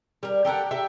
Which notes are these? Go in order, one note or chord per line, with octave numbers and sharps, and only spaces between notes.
G3 A#4
G4 A4 A#4 F#5
G4 E5